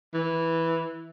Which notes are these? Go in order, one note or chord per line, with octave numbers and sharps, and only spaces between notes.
E3